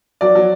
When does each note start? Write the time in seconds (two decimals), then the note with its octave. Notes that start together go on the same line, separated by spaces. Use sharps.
0.21 F#3 D5
0.35 F#3